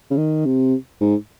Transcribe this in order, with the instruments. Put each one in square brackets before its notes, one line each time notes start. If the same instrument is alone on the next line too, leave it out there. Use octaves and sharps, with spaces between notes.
[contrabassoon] C#3
D#3
C3
G#2